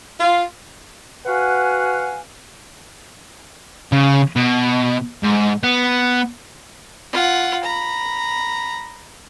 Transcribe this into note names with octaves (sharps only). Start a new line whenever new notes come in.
F4
F#4 B4 F5 F#5 G#5
C#3
B2
G#2
B3
F4 F#5
A#5 B5